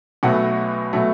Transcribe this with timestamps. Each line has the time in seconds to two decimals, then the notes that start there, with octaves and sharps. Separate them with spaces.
0.23 B1 B2 F#3 A3 F#5
0.93 B2 F#3 A3